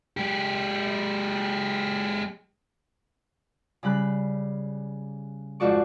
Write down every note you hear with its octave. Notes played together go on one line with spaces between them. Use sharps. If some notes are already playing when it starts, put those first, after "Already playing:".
G#3 G4
C#3 G3 B5 F#6
F2 G#2 F3 F#4 D5 C#6